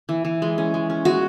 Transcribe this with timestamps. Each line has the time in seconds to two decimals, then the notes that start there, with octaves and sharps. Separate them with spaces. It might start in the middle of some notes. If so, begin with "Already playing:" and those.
0.09 E3
0.25 E3
0.42 G#3
0.58 C#4
0.74 G#3
0.90 C#4
1.05 G#3 F#4